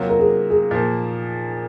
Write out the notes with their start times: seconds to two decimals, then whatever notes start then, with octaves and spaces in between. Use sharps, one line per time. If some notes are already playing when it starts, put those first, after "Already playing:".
Already playing: C3 F#3 A#3 F4
0.09 A#4
0.20 G#4
0.50 G#4
0.71 A#2 F3 A#3